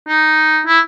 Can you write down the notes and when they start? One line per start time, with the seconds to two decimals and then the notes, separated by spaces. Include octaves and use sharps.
0.08 D#4
0.66 E4